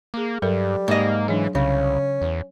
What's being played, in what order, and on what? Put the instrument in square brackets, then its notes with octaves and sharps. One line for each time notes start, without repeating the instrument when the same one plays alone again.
[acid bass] A#3 [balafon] G#4 D6
[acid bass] G2 [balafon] F#3 A4 A#4 [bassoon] G3
[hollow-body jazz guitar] G#2 D#5 [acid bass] A#3
[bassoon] C#3 [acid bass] E3 [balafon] F#3 D4
[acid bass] C2 [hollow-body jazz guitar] C#3 [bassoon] C#4
[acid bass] E2